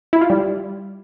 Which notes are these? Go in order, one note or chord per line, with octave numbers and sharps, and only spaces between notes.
E4
F4
G3